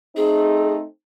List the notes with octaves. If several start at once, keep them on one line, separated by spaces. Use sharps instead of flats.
A3 C4 D#4 G#4